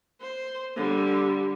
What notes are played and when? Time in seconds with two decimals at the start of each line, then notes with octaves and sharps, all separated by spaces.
0.21 C5
0.75 D3 G3